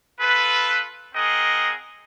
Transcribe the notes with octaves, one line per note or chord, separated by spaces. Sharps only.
F4 A4 B4
C4 G#4 A#4 D#5 F#5